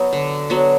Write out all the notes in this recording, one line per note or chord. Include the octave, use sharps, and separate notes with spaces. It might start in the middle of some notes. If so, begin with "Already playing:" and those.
Already playing: F#3 B3 F#4
D3
F#3 B3 F#4